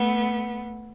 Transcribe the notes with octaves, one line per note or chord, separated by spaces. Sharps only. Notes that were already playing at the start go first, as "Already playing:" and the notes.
Already playing: A3 B3